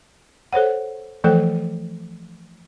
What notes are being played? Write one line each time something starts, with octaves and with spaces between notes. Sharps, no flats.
A4 C5 C#5 F#5
E3 F3 A3 A4 C5 G5